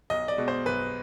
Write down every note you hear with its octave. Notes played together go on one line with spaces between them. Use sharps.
B1 D#5
D5
B2 G#3
C5
B1 B4